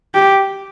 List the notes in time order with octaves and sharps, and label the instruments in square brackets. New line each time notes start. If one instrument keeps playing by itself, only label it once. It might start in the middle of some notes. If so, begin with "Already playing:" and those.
[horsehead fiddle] G4